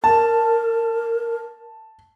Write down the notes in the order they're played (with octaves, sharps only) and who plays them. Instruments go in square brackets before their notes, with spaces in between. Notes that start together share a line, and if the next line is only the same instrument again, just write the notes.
[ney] A#4 [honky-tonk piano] A5